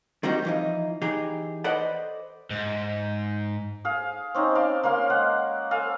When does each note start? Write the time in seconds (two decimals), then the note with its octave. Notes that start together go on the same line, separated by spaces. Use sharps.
0.23 D#3 G3 C4 D#4 F#4 G4
0.45 E3 F3 D#4
1.01 E3 D#4 G4 G#4
1.64 A4 B4 C5 D5 D#5 F#5
2.50 G#2
3.85 G#4 F5
4.35 C4 C#4 D#4
4.55 F5 A5 C6 D6
4.83 A#3 C#4 F5 C6
5.10 G#3 F#5
5.71 A4 F5 G#5